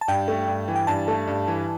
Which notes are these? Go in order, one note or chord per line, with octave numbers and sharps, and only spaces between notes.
A5
G2 G5
A3
G2
E3
G5
G2 A5
A3
G2
E3